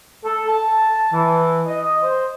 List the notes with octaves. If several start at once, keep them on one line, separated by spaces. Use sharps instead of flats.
A4
A5
E3
D#5
C5